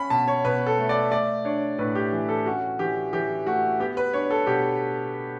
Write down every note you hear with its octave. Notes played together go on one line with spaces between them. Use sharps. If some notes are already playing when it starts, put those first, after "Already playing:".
Already playing: C#4 B5
B2 A5
C#5
B2 B4
A4
A3
D5
A3 D5
D4 C#5
A2 B4
G4
E3
A4
C#4 F#4
E3 G4
E3 G4
A3 F#4
B3 G4
B4
D4 C#5
A4
B2 G4